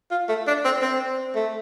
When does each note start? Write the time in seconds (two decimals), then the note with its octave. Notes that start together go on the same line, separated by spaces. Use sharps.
0.11 F4
0.29 A3
0.47 D4
0.65 C4
0.82 C4
1.35 A3